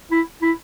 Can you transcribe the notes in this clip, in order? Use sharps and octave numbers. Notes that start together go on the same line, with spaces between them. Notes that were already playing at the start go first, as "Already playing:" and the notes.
E4
E4